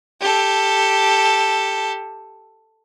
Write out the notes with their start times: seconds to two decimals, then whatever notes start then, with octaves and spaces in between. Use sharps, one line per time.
0.21 G4 A4